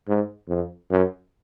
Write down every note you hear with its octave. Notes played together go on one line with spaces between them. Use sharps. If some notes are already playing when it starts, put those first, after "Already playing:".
G#2
F2
F#2